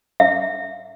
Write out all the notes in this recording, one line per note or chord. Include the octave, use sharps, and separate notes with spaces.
E5